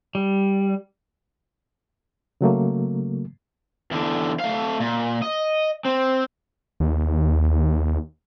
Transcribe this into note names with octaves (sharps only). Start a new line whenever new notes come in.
G3
C#3 F#3 A3 A#3
E2 D3
A3 F5
A#2
D#5
C4
D#2